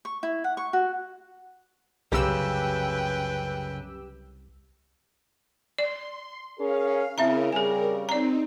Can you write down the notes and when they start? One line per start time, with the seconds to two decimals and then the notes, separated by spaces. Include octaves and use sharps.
0.05 C#6
0.23 E4
0.44 F#5
0.57 C#6
0.73 F#4
2.12 C2 F#2 C#3 G4 B4 G5 E6
5.78 D5 C6
6.58 C#4 G#4 A#4 F5
7.18 C#3 C4 E4 A#4 E5 A#5
7.53 C#3 G3 G#4 G#5
8.09 C4 D#4 D5 A#5